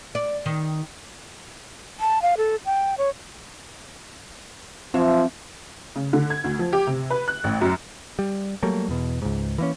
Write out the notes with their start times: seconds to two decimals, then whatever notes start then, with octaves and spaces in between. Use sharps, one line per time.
0.15 D5
0.46 D#3
2.00 A5
2.22 F5
2.38 A4
2.66 G5
2.98 C#5
4.94 F3 F#3 C4 E5 F5
5.96 C#3
6.13 D3
6.30 G#6
6.44 D2
6.59 F3
6.73 G4
6.87 C3
7.10 B4
7.28 F#6
7.44 A1
7.61 F#2
8.19 G3
8.63 F#3 G3 A3 A#3
8.89 E2 B2
9.22 C#2 G#2
9.58 E3 A#3 C#4